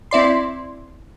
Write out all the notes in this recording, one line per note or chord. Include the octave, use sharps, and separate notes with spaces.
C4 E4 D5 C6